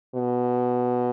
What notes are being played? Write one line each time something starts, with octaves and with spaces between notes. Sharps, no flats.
B2